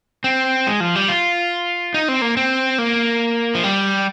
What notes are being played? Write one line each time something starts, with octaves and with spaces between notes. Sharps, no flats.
C4
G#3
F3
G3
F4
D#4
C4
A#3
C4
A#3
F3
G3